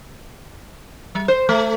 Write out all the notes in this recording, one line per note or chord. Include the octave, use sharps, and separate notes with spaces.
G3
C5
A3